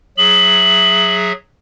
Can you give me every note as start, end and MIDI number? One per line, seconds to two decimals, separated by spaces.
0.18 1.32 54
0.18 1.32 68
0.18 1.32 76
0.18 1.15 102